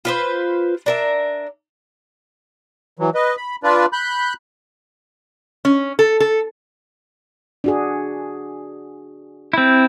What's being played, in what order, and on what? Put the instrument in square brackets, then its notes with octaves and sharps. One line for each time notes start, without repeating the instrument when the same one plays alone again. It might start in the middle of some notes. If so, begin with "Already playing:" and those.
[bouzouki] F4 B4 C5
D4 A#4 E5
[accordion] E3 F#3
B4 D#5
B5
D4 F4 B4 D5
B5 F#6 G6
[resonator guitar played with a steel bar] C#4
A4
A4
[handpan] D4 F#4 G#4
[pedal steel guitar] C4 E4